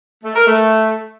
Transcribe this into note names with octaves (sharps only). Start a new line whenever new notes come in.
A3
A#4
A3